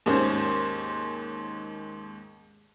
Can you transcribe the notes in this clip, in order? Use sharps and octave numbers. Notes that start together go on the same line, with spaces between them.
D#2 G#2 C#4 C5